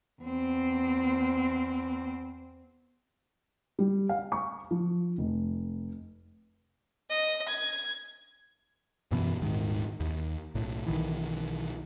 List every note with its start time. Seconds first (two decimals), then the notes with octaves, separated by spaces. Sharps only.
0.22 E2 C4
3.79 G3
4.09 F5
4.32 C#6
4.71 F3
5.18 F1
7.10 D#5
7.48 G#6
9.11 F#2 B2 E3 B3
9.42 D#1 G#2 D#3
10.00 D#2
10.55 B1 A2
10.87 B1 D#3 E3